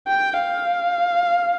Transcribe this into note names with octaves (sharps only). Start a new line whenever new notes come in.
G5
F5